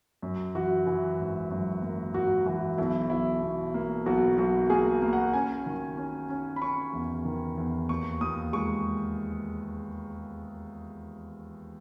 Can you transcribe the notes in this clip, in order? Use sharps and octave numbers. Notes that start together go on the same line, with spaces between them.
F#2
E3 F#4
E3
G#1
F#2
A#3
G#1 F#4
E3 F#4
B1 E4
B1 E4
B2
A#3
B1 F#4
B1 F#4
A#3 G#4
A#3
F#5
C#4 G#5
D#3
C#4
C#4
B5
C#4 C#6
E2
D#3
E2
D#2 C#6
D#2 D#6
G#3 C#6